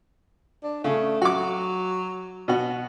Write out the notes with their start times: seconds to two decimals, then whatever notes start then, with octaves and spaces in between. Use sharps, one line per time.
0.63 D4
0.84 C#3 A3
1.22 F#3 F#4 D6
2.48 B2 F#4